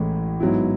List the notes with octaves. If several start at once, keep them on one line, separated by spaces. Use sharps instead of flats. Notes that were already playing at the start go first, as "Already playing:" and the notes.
Already playing: A1 A2 E3 G#3
G#2 F#3 B3 E4